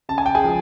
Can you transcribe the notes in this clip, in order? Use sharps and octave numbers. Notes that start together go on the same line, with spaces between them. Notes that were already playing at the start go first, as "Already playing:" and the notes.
C#3 A5
G#5
G5
G#4 G#5
F3 G#3